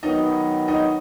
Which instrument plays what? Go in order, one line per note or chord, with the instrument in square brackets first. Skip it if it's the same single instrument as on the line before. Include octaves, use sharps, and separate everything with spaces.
[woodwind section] D#3 F#3 B3 [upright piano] D#4 D#5
[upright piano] D#4 D#5